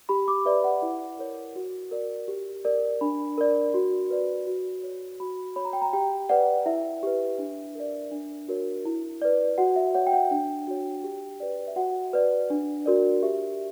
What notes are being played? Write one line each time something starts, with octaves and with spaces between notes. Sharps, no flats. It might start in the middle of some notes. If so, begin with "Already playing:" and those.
G4 B5
D6
B4 D5 E5
F#5
E4
A#4 C#5
F#4
A#4 D5
G4
A#4 D5
D4 B5
A#4 D5
F#4
B4 D5
F#4
C#5
F#4 B5
C#5 B5
A#5
G5
A#5
G4 G5
B4 D5 F#5
E4 E5
G4 B4
D4
A#4 D5
D4
F#4 A#4 C#5
E4
B4 D5
F#4 F#5
E5
C#5 F#5
G5
F#5
D4 G5
F#4 C#5
G4
B4 D5
E5
F#4 F#5
B4 D5
D4
F#4 A#4 D5
G4 E5